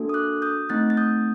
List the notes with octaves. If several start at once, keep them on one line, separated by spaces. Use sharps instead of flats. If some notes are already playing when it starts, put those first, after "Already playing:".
Already playing: A#3 D4 F#4 A4
D#6
D6 F#6
D#6 G6
A3 C4 D#4 F#6 A6
A6
D#6 G6